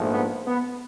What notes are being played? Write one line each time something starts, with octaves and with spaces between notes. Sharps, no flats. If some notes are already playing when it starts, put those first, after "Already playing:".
Already playing: A#1 G#2 F3 A3
B3
B3